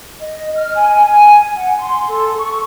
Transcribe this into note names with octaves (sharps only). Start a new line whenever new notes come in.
D#5
F6
G#5
G#5
F#5
C6
A4
C#6